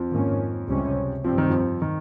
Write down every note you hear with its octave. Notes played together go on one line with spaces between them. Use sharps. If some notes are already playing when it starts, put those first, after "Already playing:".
Already playing: F2 F3
G#2 D#3 A#3 C#4
C#2 C3 G3 C#4
G2 F3 G3 C4
D#3
F2 F3
D#3